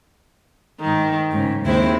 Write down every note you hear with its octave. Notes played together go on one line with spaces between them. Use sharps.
G#2 D#3
G#2 C#3
D#2 D#3 G#3 C4 E4